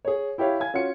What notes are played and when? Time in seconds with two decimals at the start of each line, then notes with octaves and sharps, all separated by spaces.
0.05 G#4 C#5
0.38 E4 G4 C#5 F5
0.60 F5 G#5 G#6
0.74 C#4 F4 F#4 C#7